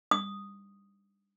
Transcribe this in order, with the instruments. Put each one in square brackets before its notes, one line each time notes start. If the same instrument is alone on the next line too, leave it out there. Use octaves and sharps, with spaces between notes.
[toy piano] D#6